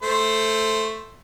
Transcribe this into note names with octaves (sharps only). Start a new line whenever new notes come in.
A3 C5